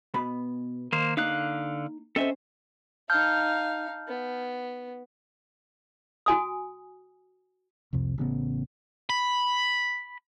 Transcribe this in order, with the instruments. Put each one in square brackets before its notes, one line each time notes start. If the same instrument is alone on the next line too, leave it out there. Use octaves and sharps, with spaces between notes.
[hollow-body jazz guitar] B2 B3 B5
[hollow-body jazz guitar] D#3 [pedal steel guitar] A#3 C5
[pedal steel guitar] D3 F5 F#6 [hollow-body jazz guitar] A#3 D#4
[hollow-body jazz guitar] C4 C#4 C5 [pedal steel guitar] A4 D#5 E5
[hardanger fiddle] D#4 F5 [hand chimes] A5 F6 G6
[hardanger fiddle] B3
[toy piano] F#4 G#5 D#6
[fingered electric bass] C2 F2 C3
A1 C#3 B3
[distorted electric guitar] B5